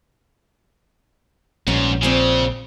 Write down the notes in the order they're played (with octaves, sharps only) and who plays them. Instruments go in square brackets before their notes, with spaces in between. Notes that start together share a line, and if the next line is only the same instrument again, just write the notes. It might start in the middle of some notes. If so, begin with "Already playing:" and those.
[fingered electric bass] A#1 [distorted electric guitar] G#2 [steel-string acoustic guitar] G3 B3 C#4
[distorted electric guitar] C#3 [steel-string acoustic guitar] F3 C4 D5